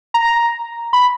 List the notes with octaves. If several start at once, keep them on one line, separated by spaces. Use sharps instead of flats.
A#5
B5